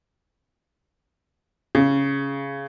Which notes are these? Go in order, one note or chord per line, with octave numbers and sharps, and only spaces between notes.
C#3